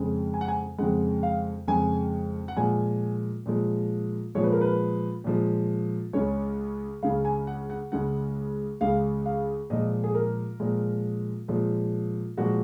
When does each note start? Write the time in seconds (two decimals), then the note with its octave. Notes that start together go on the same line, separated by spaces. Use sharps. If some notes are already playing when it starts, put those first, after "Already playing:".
Already playing: F2 C#3 G#3
0.34 G#5
0.41 F#5
0.48 G#5
0.78 F2 C#3 G#3 F#5
1.23 F5
1.68 F2 C#3 G#3 G#5
2.48 F#5
2.57 A#2 F3 G#3 G#5
3.46 A#2 F3 G#3
4.35 A#2 F3 G#3 C#5
4.43 B4
4.52 A#4
4.61 B4
5.24 A#2 F3 G#3
6.13 C#2 C#3 G#3 C#5
7.03 C#2 C#3 G#3 F5
7.25 G#5
7.47 F#5
7.70 F#5
7.92 C#2 C#3 G#3 F#5
8.81 C#2 C#3 G#3 F5
9.26 F5
9.70 A#2 F3 G#3 D#5
10.04 G#4
10.14 A#4
10.60 A#2 F3 G#3
11.48 A#2 F3 G#3
12.37 A#2 F3 G#3 F#4